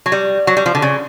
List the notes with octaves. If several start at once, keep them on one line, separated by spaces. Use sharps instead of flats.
F#3
G3
F#3
G3
F3
D3
C#3